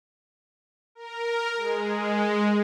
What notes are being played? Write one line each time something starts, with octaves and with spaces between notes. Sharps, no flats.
A#4
G#3